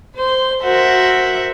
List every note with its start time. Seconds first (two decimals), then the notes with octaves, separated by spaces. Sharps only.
0.16 C5 C6
0.62 F#4 A#4 C5 E5 F#5